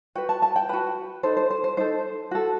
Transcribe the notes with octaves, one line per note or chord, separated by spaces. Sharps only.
F#4 B4 G5
A5
A5
G5
F#4 B4 B5
D#4 A4 C5
C5
C5
C5
D#4 A4 C5
F#4 A4